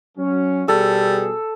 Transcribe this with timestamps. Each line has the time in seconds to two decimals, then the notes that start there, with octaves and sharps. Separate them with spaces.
0.18 F#3 C#4
0.68 B2 G3 G#4 A4